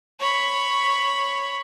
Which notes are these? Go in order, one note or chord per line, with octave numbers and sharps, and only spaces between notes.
C#5 B5